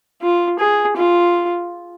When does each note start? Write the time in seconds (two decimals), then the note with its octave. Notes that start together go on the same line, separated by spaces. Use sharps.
0.22 F4
0.60 G#4
0.97 F4